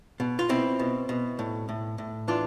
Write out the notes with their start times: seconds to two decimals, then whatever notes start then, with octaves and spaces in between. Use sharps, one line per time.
0.20 B2
0.39 F4
0.49 B2 C4 E4
0.80 B2
1.09 B2
1.39 A2
1.69 A2
1.98 A2
2.28 E3 D4 F4